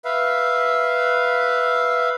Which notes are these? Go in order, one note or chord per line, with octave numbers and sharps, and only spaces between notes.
B4 E5 F5